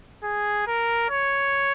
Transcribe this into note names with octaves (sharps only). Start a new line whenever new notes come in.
G#4
A#4
C#5